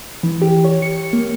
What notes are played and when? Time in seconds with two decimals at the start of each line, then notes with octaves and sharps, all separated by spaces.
0.23 E3
0.42 G4
0.65 C#5
0.82 C#7
1.13 A#3